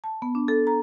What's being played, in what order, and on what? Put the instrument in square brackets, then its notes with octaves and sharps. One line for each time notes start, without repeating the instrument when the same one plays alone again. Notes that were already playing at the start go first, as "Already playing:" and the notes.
[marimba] A5
B3
D4
A4
A#5